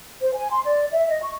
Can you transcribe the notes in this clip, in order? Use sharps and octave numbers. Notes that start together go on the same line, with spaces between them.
C5
G#5
C6
D5
E5
D#5
C#6